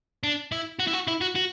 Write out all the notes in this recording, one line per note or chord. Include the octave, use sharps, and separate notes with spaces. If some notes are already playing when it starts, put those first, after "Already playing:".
D4
E4
F#4
E4
F#4
E4
F#4
F#4